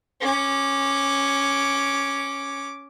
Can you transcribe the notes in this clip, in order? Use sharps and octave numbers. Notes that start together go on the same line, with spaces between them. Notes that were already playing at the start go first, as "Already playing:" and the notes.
C#4 D6